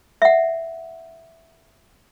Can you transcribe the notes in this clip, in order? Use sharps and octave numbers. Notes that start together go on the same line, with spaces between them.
E5 F#5